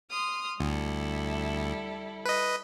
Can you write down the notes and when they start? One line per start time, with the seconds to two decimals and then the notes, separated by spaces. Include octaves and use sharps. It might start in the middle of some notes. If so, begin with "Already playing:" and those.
0.10 C6 D#6 F6
0.60 D2 G3 E4 A4
2.25 B4 D#5